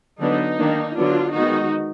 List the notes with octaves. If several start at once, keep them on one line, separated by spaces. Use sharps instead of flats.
D3 F#3 B3 D4 D#4
D#3 A#3 D4
D3 F#3 B3 D4 F4
D#3 G#3 B3 D#4 F#4